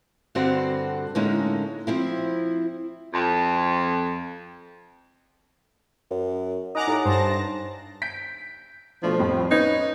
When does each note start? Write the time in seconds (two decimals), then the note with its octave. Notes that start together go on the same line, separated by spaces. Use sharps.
0.35 G2 D3 G3 C4 F#4 C5
1.15 A2 D3 G#3 A#3 C#4 D#4
1.87 F3 C4 E4
3.14 F2
6.11 F#2
6.75 D#4 F#5 G#5 A#5 D6 D#6 F#6
6.87 A2 D#4 G4 C#5
7.05 G2 C5 A5 A#6
8.02 G6 B6 D7
9.03 B2 F3 A3 D4
9.19 F2 A2 G3
9.51 C#4 D#4 B4 G#6